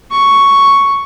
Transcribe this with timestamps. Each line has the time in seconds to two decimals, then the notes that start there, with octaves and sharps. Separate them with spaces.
0.11 C#6